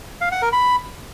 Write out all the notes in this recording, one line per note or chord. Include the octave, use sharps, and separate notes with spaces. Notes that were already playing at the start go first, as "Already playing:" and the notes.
F5
F#5
A#4
B5